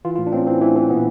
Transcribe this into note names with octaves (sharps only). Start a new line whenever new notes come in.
E3 F4
F4
A2
D4
A2 C4 C#4
E3 C4
E3
E3
A#2 B3